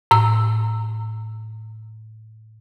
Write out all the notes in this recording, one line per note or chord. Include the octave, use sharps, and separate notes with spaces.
A2 E6